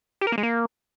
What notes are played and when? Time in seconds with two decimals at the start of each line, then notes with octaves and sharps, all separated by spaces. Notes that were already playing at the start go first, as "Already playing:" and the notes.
0.21 G4
0.27 A#4
0.32 A#3
0.38 G#3
0.43 A#3